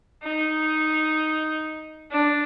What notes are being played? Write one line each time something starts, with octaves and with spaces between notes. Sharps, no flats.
D#4
D4